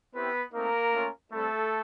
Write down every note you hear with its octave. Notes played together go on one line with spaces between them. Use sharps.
B3 C4 E4 G4 B4
A3 A#3 C4 D#4 A#4
A3 C#4 F4
G3 A3 C4 E4 A4